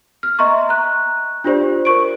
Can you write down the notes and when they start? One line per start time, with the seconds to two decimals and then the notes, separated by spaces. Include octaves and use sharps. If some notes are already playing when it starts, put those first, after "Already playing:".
0.23 F6
0.39 D#5 E5 A#5 C6 C#6
0.69 A#5 F#6
1.44 D4 F4 G4 C5 D5
1.85 A#4 C5 C#6 D7